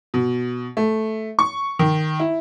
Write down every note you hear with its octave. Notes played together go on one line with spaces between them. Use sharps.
B2
A3
C#6
D#3
E4